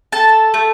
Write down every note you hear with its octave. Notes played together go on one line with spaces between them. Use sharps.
A4 A5
A3